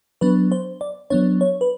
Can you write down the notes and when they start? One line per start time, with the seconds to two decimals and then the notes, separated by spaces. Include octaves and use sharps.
0.21 F#3 B3 D4 B4
0.52 C5
0.81 D5
1.10 F#3 B3 D4 C#5
1.41 C#5
1.61 B4